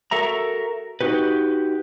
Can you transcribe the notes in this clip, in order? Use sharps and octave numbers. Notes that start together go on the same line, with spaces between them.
F#4 A4 A#4 E5 A#5
D#4 F#4 G4 B4